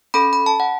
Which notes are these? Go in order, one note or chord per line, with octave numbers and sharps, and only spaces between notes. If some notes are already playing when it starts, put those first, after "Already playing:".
C#4 A4 B5
B5
A5
F#5